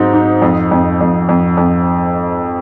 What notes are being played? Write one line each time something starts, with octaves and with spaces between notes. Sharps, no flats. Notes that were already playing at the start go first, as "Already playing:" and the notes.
Already playing: G#2 F#3 C4 D#4
D#4
F2
F2
F2
F2
F2